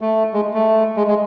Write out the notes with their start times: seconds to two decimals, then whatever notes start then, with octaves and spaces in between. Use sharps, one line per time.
0.01 A3
0.34 G#3
0.54 A3
0.97 G#3
1.07 G#3